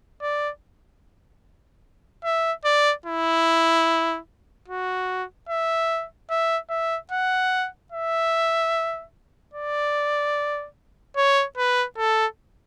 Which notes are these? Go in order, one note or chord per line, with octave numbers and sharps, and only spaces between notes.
D5
E5
D5
E4
F#4
E5
E5
E5
F#5
E5
D5
C#5
B4
A4